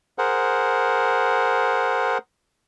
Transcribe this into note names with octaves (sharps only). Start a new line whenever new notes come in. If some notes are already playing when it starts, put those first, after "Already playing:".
G#4 A#4 C5 F#5